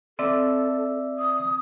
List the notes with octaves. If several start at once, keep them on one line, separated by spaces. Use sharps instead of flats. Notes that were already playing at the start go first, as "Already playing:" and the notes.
C4 A4 D5 E5 E6
D#6